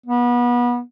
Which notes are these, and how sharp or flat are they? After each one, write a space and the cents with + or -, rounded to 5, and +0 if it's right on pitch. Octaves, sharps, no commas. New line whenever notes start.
B3 -30